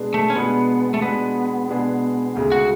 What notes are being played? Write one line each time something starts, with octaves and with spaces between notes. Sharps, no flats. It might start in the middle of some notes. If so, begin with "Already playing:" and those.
Already playing: B2 G#3 D4 G#4 B4
A3
C#4
B2 G#3 B3 D4 G#4 B4
A3
B2 G#3 B3 D4 G#4 B4
B2 G#3 D4 G#4 B4
D2 C#3 G#3
F#4